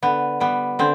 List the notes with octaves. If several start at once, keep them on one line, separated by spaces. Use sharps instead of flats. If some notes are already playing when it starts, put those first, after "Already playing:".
D3 B3
G3 B3
D3 C4